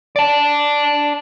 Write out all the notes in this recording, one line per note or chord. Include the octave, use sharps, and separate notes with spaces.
D5 A5